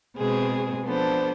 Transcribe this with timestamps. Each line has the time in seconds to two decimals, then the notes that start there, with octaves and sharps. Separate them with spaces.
0.18 B2 G#3 C4 G#4
0.85 F3 B3 D4 A4 C5